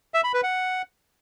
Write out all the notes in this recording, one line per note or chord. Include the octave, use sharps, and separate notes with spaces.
E5
B5
B4
F#5